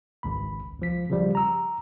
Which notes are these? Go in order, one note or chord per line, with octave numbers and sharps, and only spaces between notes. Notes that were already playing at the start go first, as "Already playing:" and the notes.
G#1 C#2 B5
C#2 F3 B6
C#3 F3 G3
A#5 E6